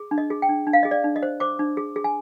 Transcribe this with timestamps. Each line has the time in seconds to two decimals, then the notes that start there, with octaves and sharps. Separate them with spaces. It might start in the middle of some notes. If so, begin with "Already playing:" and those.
Already playing: G#4
0.11 D4
0.18 D#5
0.30 G#4
0.42 G5
0.49 D4
0.67 D4
0.73 F5
0.83 G#4 D#5
0.91 D5
1.04 D4
1.16 D#5
1.23 C5
1.40 C5 D6
1.59 D4
1.77 G#4
1.96 G#4
2.04 G#5